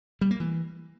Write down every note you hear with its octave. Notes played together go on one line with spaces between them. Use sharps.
G3
A#3
E3